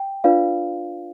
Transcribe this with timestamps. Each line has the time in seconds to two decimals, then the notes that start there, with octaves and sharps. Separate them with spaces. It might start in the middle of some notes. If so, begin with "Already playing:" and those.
Already playing: G5
0.24 D4 F4 B4 D5 F5